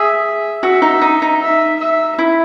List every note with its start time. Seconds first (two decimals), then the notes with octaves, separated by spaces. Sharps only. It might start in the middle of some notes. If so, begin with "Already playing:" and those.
Already playing: G#4 E5
0.63 F#4 E5
0.82 D#4
1.01 D#4
1.22 D#4
1.41 E5
1.80 E5
2.19 E4